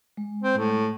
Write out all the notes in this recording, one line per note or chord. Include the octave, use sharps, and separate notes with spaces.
G#3
C4
A2